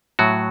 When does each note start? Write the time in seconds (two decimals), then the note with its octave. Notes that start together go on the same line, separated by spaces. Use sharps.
0.19 A2 F#3 F#4